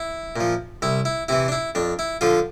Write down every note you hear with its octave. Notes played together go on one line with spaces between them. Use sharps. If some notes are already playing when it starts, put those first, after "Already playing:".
Already playing: E4
A#2 F3
C2 E4
E4
C3 E3 E4
D4
E4
F2 D4
E4
D3 F3 F4